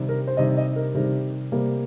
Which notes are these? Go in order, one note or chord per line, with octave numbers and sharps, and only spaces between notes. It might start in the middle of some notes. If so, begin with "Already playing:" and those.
Already playing: C3 D#3 G3
A#4
C5
C3 D#3 G3 D#5
D#5
A#4
C3 D#3 G3
C3 G3 A#3